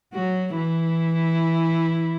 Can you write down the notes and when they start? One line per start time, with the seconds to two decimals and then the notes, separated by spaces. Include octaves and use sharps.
0.13 F#3 F#4
0.56 E3 E4